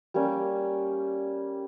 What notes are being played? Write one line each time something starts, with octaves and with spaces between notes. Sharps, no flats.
G3 A#3 C#4